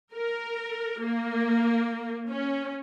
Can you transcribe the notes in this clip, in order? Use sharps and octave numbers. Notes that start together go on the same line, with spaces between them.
A#4
A#3
C#4